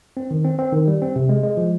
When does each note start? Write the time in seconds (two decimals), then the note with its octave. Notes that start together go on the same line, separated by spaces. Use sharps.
0.17 C4
0.31 D#3
0.44 C4
0.59 C4
0.73 D#3
0.88 G3
1.02 C4
1.16 C3
1.29 G#3
1.43 G#3
1.57 F3